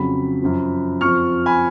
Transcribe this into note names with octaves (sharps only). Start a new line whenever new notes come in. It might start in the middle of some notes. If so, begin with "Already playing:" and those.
Already playing: F2 C#3 F#3 B5
F#2 F3
F2 F3 C#6 F6
G#5 B5